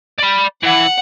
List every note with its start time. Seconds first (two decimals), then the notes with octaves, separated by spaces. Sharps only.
0.18 D5 B5
0.63 E3 F#5